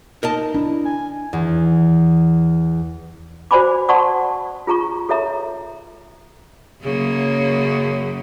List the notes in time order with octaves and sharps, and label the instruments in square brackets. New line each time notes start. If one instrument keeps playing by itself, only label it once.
[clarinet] D#4 [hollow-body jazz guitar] A#4 D#5 A5
[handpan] D4 [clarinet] E4
[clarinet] G#5
[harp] E2
[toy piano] F#4 C5 D5 G#5 B5 D6
D5 F#5 A5 C6 C#6 D#6
F4 G#4 A#5 C#6
G#4 A4 C#5 E5 A#5
[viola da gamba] F#2 C#3 A#3